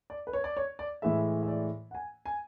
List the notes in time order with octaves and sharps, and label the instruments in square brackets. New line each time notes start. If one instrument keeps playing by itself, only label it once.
[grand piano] D5
B4
C#5
D5
C#5
D5
A2 E3 G#3 E5
E5
D5
F#5
G#5
G#5